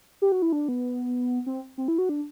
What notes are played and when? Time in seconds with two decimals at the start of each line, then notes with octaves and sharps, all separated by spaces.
0.22 G4
0.32 F#4
0.42 E4
0.52 D4
0.68 B3
1.46 C4
1.78 C4
1.88 E4
1.98 F#4
2.09 D4